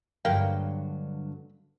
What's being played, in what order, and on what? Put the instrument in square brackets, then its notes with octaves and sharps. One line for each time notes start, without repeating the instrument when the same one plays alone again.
[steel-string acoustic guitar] G2 D3 F#3 [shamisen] A#3 G4 G5